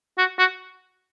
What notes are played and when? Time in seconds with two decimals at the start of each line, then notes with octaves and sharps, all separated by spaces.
0.18 F#4
0.38 F#4